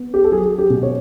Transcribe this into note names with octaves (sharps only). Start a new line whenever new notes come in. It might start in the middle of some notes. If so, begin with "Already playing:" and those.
Already playing: B3
G4
A4
F#3 G#4
G4
B2
C#5